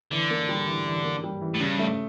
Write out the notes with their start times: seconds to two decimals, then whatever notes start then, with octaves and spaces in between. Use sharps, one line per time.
0.11 D3 E3
0.30 A#3
0.49 G3
0.67 E3
0.86 E3
1.04 A#3
1.24 G3
1.41 E3
1.54 A2
1.60 G2 C#3
1.79 A3